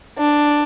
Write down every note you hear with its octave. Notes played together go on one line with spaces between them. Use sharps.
D4